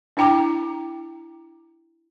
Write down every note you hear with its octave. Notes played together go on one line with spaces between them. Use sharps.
D4 E4 G5 A#5 D6